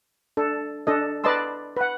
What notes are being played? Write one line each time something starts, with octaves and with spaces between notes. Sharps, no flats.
D4 A4
D4 A4 D#5
B4 D5 D#5 A5 C6 E6
B4 F#5